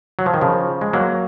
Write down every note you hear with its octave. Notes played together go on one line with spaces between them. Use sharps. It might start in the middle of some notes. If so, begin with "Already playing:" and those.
F#3
F3
D#3
C#3 F3
G#3
F#3 A#3